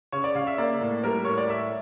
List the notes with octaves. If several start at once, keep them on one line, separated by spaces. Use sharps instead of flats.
C#3 C#5
D5
C#3 F5
E5
A#3 D5
A2
G3 A#4
A2 C#5
D5
A2 E5